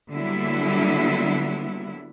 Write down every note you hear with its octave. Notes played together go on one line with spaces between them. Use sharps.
D3 F#3 G3 A#3 B3 E4